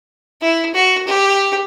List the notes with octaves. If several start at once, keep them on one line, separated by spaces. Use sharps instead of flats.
E4
F#4
G4